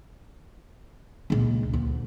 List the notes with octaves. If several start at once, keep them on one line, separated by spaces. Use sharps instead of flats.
C#2 A#2
D2